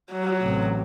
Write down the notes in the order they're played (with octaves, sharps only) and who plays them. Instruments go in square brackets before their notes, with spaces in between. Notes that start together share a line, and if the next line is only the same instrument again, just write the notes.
[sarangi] F#3
[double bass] A1 C3